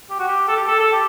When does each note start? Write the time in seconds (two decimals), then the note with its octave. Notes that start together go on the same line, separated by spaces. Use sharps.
0.10 G4
0.19 F#4
0.27 G4
0.48 A4
0.57 G4
0.68 A4
0.80 A4
0.92 G4